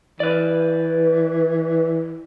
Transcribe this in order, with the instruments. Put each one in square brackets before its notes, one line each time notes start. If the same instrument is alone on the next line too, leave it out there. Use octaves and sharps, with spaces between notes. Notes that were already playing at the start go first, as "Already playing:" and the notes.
[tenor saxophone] E3 [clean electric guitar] B4 D5